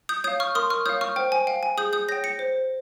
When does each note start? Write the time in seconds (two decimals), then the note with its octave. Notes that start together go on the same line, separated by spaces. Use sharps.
0.09 D#6 G6
0.24 C#5 F5 D#6 G6
0.40 C#6 F6
0.55 A#4 C6 D#6
0.70 C#6 F6
0.86 C#5 F5 D#6 G6
1.01 C#6 F6
1.16 C5 G5
1.32 G#5
1.47 F5 G5
1.63 G#5
1.78 G#4 D#6 G6
1.93 D#6 G6
2.08 C#5 G5 G6 A#6
2.24 A#6 C#7
2.39 C5